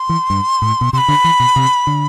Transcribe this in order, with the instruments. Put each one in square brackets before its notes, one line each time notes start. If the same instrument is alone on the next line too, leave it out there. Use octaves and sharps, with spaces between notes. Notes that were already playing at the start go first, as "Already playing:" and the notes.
Already playing: [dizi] C6
[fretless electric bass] E3
G2
A2
B2
[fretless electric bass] C3 [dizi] C6
[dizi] B5
[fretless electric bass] D3
E3
B2
C3
D3